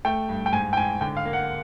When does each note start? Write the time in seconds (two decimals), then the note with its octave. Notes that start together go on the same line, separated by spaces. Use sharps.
0.05 A3 G5
0.29 G2
0.46 G5
0.53 G#2 G#5
0.73 G5
0.77 G#2 G#5
1.01 D3 G5
1.17 F5
1.25 A#3
1.33 F#5